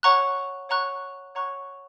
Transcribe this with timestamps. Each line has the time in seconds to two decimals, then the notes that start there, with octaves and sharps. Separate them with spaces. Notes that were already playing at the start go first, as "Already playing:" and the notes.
0.03 C#5 F#5 A#5 C#6 F#6
0.69 C#5 F#5 A#5 C#6 F#6
1.35 C#5 F#5 A#5 C#6 F#6